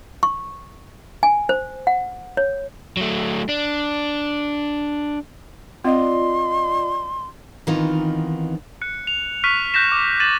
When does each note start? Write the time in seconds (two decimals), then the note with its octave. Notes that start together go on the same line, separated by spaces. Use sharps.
0.23 C#6
1.23 G#5
1.49 C5
1.87 F#5
2.37 C#5
2.97 F#3 A3
3.49 D4
5.85 C4 F4 D5 D#5 C6
7.67 D#3 E3 B3 C4 D#4 F4
8.82 F#6 C#7
9.07 F7
9.44 C#6 F6 F#6 B6 D#7
9.74 F#6 G6 A#6 B6 E7
9.92 D6
10.20 A6 D#7 E7 F#7